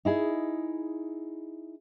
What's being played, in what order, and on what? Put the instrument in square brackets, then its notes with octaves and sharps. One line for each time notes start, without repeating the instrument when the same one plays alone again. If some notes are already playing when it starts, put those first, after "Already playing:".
[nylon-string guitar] D#4 E4 G#4